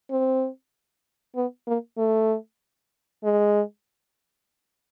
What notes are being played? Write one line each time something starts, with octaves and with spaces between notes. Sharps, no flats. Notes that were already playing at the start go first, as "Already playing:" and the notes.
C4
B3
A#3
A3
G#3